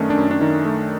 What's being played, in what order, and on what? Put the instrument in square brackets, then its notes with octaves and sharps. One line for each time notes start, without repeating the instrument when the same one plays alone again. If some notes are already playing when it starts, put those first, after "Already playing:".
Already playing: [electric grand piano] F#2 D#3 A3 C#4 D4
D4
F#2 C#4
D4
D#3 D#4
A3